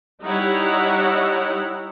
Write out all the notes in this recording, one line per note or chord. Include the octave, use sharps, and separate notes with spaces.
G3 D#4 E4 C#5 F#5